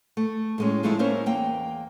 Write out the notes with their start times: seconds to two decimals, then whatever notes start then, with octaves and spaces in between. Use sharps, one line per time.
0.17 A3
0.58 A2 G#3 C#4
0.83 F3 G#3 A3 C4 D#4 E4
0.99 A#3 C#4 E4 A#4 C5 C#5
1.26 E2 A#3 G5